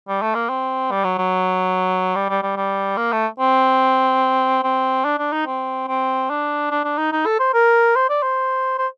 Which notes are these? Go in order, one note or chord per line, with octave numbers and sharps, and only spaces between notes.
G3
A3
A#3
C4
G3
F#3
F#3
G3
G3
G3
G3
A#3
A3
C4
C4
D4
D4
D#4
C4
C4
D4
D4
D4
D#4
D#4
A4
C5
A#4
C5
D5
C5
C5